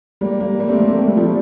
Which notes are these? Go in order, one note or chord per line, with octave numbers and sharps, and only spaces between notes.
G3 A#3
G3 A#3
G3 A#3
A3 C4
G3 A#3
A3 C4
A3 C4
G3 A#3
F3 A3
G3